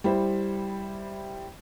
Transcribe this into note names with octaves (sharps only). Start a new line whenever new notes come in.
G3 E4 C5